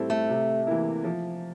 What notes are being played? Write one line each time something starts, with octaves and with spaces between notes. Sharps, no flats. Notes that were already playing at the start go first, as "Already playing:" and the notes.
Already playing: A2 G3 C4 E4 A4
A3
C3
E3 A#3 E4
F3